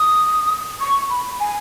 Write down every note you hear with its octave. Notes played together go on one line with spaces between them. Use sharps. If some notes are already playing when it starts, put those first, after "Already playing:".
Already playing: D#6
C#6
B5
G#5